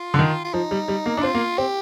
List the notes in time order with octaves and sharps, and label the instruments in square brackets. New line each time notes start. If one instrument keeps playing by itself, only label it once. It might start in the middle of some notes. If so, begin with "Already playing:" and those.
Already playing: [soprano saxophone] F4
[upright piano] D3
D#3
[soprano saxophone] F4
[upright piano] F3 [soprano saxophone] D#4
[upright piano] G3
G3
A#3
D4
[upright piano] C4 [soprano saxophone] F4
[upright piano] A#3
[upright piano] C4 [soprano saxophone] G4